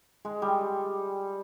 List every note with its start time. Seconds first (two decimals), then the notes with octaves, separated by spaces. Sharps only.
0.25 G#3
0.42 G3